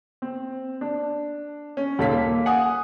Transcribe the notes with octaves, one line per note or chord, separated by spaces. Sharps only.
C4
D4
C#4
D#2 A#2 A4 F5 B6
A#3
F#5 G#5 D#6